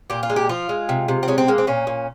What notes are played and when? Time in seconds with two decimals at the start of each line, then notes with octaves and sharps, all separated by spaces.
0.10 A#2 G4
0.23 F4
0.29 G#3
0.36 G4
0.49 F3 F4
0.69 G#3
0.89 C3
1.08 C3
1.23 C4
1.28 G#3 C#4
1.38 C4
1.48 G#3 A#3
1.58 C4
1.67 A#2 C#4
1.87 A#2